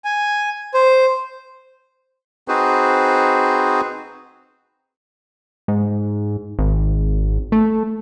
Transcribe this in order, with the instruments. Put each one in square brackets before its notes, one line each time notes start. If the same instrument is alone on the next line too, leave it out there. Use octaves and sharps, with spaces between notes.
[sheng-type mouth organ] G#5
C5
[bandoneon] C4 D#4 F#4 G#4 B4 C5
[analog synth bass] G#2
G#1
A3